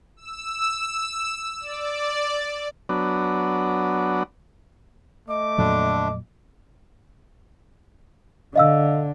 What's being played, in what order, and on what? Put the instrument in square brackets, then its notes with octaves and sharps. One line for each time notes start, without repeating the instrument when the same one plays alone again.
[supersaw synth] E6
D5
[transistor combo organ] F#3 B3 D4
[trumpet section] A3 D6 [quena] D#5
[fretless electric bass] F2 A#2 F#3 [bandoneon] D3 D4
[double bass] D3 [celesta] D#5 F5 E6